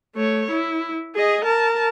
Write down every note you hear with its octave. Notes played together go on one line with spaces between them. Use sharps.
A3 C#5
E4
G#4 D#5
A#4 A5